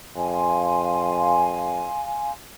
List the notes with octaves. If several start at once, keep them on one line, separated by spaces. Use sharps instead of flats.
F2 F5 G#5 C6